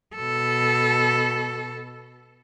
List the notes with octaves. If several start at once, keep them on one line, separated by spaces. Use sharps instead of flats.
B2 A4